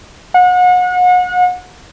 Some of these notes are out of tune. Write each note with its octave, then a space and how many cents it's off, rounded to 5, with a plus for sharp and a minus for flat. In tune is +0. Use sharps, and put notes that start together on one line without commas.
F#5 -35